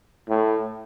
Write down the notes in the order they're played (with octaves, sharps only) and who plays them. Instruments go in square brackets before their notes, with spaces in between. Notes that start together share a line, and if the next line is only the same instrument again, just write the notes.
[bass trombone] A2